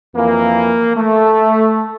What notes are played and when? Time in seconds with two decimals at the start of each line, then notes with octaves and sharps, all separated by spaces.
0.14 F2 E3 A#3
0.96 A3